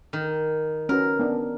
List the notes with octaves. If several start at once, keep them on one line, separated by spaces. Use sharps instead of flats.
D#3
C#4 F#4 A#4 B4
B3 D4